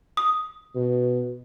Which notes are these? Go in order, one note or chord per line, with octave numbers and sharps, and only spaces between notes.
D#6
B2